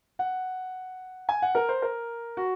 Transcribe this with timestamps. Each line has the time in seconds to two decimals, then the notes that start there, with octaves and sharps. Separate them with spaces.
0.19 F#5
1.29 G#5
1.42 F#5
1.55 A#4
1.69 C5
1.82 A#4
2.37 F#4